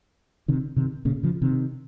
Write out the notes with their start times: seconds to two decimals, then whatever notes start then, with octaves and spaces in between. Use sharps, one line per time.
0.48 C3 D#3
0.76 C3 D#3
1.05 A#2 C#3
1.23 C#3 F3
1.42 C3 D#3